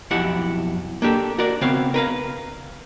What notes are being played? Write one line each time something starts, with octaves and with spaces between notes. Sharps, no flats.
B1 F2 E4 G4 F#5
A#3 D4 G4 A4
F#4 A#4 D5
C#3 B3 C4 C#5 F5
A#4 B4 F5